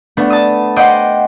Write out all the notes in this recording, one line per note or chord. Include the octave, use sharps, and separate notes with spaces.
A3 B3 D4
A5 D#6
C5 D#5 F#5 G5 D6